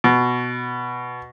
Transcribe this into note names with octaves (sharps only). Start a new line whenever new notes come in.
B2